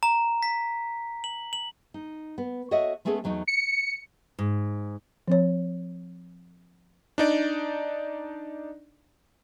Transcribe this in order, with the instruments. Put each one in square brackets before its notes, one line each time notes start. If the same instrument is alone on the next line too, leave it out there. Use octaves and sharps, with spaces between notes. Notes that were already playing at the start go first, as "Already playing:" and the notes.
[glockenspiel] A#5
B6
F#7
F#7
[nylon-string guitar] D#4
B3
F#4 A4 C#5 D#5 E5 F#5
G#3 A3 B3 C#4 G#4 A4
E2 F#3 A3 D#4
[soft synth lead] C#7
[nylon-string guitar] G#2
[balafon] F3 C4 C#5
[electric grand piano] D4 D#4 D5